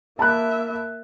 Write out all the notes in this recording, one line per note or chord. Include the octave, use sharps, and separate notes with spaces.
A#3 E5 A5 B5 F#6